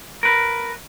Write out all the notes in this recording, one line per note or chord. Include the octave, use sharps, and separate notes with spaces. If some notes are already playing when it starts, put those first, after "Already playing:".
A#4 B4